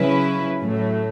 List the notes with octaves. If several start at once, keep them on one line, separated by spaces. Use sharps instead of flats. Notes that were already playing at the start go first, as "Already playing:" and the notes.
Already playing: C#3 F#3 C#4 E4 B4
A2 F#3 A3